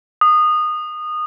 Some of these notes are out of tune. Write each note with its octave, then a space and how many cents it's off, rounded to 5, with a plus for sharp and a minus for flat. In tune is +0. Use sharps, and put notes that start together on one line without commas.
D#6 -20